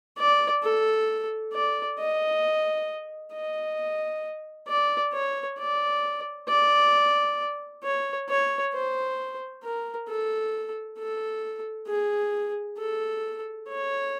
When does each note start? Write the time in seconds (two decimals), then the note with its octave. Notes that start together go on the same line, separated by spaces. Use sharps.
0.18 D5
0.63 A4
1.54 D5
1.99 D#5
3.34 D#5
4.68 D5
5.14 C#5
5.59 D5
6.49 D5
7.84 C#5
8.29 C#5
8.74 C5
9.64 A#4
10.09 A4
10.99 A4
11.89 G#4
12.79 A4
13.69 C#5